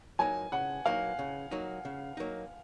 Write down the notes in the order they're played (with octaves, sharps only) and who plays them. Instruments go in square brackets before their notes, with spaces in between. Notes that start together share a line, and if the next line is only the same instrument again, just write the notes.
[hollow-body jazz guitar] F#3 A#3 D#4 [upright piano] G#5
[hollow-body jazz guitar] C#3 [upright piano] F#5
[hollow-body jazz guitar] F#3 A#3 D#4 [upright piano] F5
[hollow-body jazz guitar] C#3
F#3 A#3 D#4
C#3
F#3 A#3 D#4